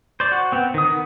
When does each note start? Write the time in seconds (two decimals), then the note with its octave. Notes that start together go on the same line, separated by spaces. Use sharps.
0.20 C5 D5
0.32 F#4
0.52 B3 C4
0.74 D#3 D#6
0.90 B3